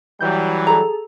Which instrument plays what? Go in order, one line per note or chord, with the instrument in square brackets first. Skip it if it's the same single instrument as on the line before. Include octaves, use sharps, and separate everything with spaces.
[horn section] E3 F#3 G3 [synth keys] G6
[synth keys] G#4 A4 [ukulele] A#5